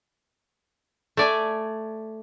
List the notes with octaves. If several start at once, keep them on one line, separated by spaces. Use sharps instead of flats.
A3 D5 G#5